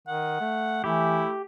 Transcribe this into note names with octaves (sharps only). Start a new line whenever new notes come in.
D#3 F#5
A3
E3 A3 E4 G4